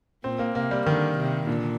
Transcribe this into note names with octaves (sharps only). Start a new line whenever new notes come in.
A#2 C4
A#3
C3 A#3
G3
D3 D#3
C3
A#2 D3